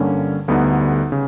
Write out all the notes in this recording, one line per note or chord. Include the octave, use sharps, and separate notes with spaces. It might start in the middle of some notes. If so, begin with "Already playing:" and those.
Already playing: G2 D3 G3 A#3 C#4
D2 D3 G3 B3 D#4
C#3